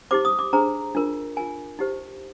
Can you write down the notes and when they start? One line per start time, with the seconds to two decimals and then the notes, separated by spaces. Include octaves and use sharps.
0.11 D#4 G4 C5 D6
0.25 D#6
0.39 D6
0.53 D4 G#4 C5 A#5
0.95 D4 F4 A#4
1.37 F4 A#4 G#5
1.79 D#4 G4 C5